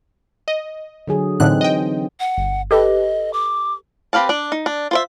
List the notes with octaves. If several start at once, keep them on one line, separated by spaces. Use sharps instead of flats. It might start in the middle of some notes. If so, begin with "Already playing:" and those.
D#5
D3 F#3 G#4
A2 D3 E3 C4 D#4 F#6
D#5 G5
F#5
G1
G4 A4 B4 D#5
D6
C4 G4 B4 F5 A5
D4 D5
D#4
D4
F4 C5 E5